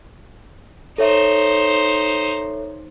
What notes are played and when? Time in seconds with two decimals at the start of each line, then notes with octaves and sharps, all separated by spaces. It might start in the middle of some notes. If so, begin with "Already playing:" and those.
0.98 D#4 A4 C5 C#5 E5